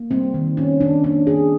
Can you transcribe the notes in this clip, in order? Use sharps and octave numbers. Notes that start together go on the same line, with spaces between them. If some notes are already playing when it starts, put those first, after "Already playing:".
Already playing: A#3
G3 C4
D#3
D#3 C#4
D#3 D4
A#3 D4
D#3 G#4